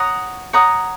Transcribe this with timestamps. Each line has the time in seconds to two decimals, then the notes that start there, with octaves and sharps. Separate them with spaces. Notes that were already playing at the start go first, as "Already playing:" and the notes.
Already playing: C#5 F#5 A#5 D#6
0.53 C#5 F#5 A#5 D#6